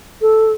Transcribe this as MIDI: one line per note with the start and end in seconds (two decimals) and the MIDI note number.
0.21 0.52 69